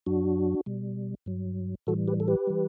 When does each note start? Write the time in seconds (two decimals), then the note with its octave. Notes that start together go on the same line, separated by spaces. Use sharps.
0.06 F#2 F#3 D4 F#4
0.66 B2 G3
1.26 G2 F#3
1.87 A2 E3 G3 F#4 A4
2.08 G4 B4
2.20 A4
2.28 G4 B4
2.47 E3 G3